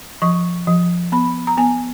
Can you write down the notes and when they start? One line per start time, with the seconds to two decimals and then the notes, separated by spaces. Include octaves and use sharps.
0.22 F3 C#6
0.67 F3
1.12 B3 B5
1.47 A#5
1.57 B3 G#5